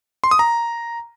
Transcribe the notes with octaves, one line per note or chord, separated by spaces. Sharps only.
C6
D#6
A#5